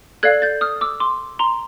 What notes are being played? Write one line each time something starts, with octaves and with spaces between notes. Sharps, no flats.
A4 D5 F5 F#6 G#6
G6 A6
D#6 F6
D6 E6
C6 D6
A#5 C6